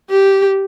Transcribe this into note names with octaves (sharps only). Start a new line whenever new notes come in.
G4